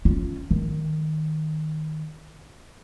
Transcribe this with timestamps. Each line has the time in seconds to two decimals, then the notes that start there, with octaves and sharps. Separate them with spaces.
0.05 C#4 F4
0.51 D#3